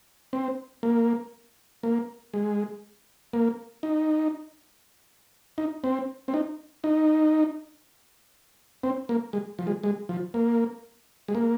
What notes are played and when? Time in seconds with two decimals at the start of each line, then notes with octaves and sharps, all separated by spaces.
0.33 C4
0.83 A#3
1.83 A#3
2.34 G#3
3.33 A#3
3.83 D#4
5.58 D#4
5.84 C4
6.28 C4
6.34 D#4
6.84 D#4
8.83 C4
9.09 A#3
9.33 G#3
9.59 F3
9.67 G#3
9.83 G#3
10.09 F3
10.34 A#3
11.28 G#3
11.35 A#3